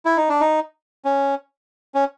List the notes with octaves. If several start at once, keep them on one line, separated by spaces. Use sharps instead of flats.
E4
D#4
D4
D#4
C#4
C#4